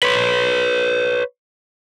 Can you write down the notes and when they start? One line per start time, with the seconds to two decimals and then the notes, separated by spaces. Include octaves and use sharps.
0.03 B4 C#5